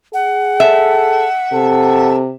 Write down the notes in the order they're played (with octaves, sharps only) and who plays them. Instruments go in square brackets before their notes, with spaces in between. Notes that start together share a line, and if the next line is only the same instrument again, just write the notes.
[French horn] G#4 [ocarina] F#5
[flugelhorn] A4 [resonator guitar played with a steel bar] E5
[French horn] C3 [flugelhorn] A4